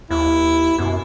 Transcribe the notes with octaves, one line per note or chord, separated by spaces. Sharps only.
D#2 E4
F#2 B2